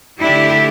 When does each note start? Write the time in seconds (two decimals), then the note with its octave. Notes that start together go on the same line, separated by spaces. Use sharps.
0.20 D3 A3 D4 E4 G4